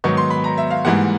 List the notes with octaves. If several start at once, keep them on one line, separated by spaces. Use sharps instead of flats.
G#2 D#3 F#3 B3 C#6
C6
B5
A#5
E5
F5
G#2 E3 G3 A#3 F#5